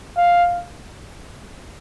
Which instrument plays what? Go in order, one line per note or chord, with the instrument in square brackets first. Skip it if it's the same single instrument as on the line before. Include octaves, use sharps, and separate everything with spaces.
[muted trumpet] F5